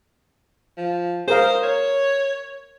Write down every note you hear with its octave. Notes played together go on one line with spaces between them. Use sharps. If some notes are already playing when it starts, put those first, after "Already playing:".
F3
G#4 A#4 C5 F5
C#5